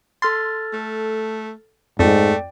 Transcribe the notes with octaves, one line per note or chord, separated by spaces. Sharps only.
A4 C6 F6 A6
A3
F2 G#2 A3 D5 G5